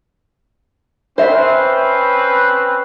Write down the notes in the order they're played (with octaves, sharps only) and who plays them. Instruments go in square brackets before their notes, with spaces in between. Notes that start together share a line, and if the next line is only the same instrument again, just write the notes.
[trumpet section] C4 C#4 B4 [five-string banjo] C5 E5